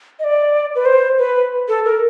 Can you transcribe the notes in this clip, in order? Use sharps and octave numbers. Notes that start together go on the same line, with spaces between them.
D#5
D5
B4
C5
B4
A4
A#4